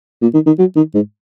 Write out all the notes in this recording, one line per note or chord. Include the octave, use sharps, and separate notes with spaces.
A#2
D#3
D#3
F#3
D#3
G#2